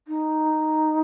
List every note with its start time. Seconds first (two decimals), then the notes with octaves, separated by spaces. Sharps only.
0.08 D#4